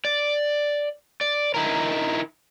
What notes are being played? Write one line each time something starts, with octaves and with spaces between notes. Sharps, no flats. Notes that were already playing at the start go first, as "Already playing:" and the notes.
D5
D5
D#4 E4 A#4